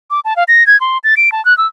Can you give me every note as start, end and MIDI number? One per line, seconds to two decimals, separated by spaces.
0.11 0.20 86
0.25 0.36 81
0.36 0.44 77
0.48 0.66 94
0.67 0.79 92
0.81 0.98 84
1.04 1.15 93
1.17 1.32 98
1.32 1.44 81
1.45 1.56 90
1.58 1.67 88